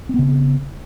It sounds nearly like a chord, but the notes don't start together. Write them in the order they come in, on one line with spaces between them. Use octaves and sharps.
C4 B3 C#3